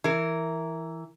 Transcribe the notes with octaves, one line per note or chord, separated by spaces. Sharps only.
E3 A#4